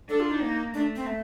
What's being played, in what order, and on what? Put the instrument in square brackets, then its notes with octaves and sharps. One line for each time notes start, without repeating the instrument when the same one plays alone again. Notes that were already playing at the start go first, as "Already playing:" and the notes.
[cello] D4 [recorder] A4
[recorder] F4
D#4
[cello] A#3
[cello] A3 [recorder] D4
[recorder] C4
A3